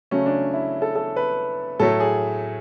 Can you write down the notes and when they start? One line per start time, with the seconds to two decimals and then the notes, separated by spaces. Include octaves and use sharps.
0.11 C#3 F#3 A3 C#4
0.26 D4
0.54 E4
0.82 A4
0.96 A4
1.17 B4
1.80 A2 F#3 A3 A4
2.00 G#4